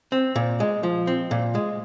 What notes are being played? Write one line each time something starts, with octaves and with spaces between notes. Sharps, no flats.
C4
A#2
G#3
F3
C4
A#2
G#3